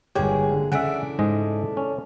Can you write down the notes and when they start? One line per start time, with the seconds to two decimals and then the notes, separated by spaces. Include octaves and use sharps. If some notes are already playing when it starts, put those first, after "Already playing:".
0.15 G1 G#3 A#3 G4 G#4 C#5 G#5
0.52 D3
0.72 C#3 E3 A3 D4 E5 F#5 D7
1.19 G#2 G#3 D#5
1.77 C#4